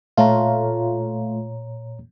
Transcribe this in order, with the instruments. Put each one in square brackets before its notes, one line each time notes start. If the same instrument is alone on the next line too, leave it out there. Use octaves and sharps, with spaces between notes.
[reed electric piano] A#2 C#5 A#5 [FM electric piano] A3 F4